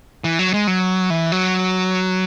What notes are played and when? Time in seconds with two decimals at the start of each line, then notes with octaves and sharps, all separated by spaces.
0.24 E3
0.39 F#3
0.53 G#3
0.67 F#3
1.10 E3
1.32 F#3